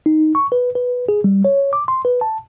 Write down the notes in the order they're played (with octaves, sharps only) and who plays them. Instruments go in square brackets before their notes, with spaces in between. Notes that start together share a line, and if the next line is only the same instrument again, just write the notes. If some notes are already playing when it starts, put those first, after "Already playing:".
[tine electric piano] D#4
C#6
B4
B4
G#4
G3
C#5
D6
C6
B4
A5